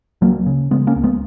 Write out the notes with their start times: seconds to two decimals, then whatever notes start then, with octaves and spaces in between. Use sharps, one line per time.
0.21 C#2 F#3 A#3
0.46 C#3
0.71 C#3 G#3 B3
0.87 A#3 C#4
0.96 C#2
1.04 G#3 B3